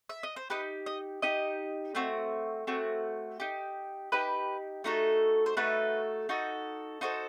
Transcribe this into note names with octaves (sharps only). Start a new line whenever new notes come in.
E5
D#5
C5
D#4 G4 B4
D#5
D#4 G4 D#5
A3 C4 F#4
A3 C4 F#4
D#4 G4
D#4 G4 B4
A3 D#4 F#4 A4
C5
A3 D#4 F#4 A4 B4
D#4 F#4 A4
D#4 F#4 A4 C5